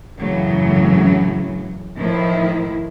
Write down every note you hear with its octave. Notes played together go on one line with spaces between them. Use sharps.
F#2 A2 C#3 E3 F#3
A2 D#3 F3 E4